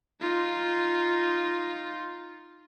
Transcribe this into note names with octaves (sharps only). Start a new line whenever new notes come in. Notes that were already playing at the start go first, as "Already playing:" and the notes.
D#4 F4